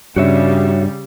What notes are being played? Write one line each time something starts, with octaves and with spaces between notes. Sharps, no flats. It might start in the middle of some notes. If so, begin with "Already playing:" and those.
G2 C#3 G3 F#4 C#5 E5